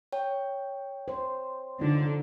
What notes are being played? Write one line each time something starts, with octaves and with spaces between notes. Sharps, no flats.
C#5 G5
C5
D3 D#4 F4